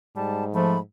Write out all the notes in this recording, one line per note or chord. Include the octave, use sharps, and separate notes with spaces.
G#2 G3 A5
F3 A3 B5